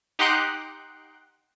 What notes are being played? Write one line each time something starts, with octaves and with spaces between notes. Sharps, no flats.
D#4 G4 F#5 C6 F#6 D7